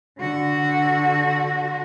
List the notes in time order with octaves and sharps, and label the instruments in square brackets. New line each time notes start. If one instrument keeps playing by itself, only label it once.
[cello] D3 F#4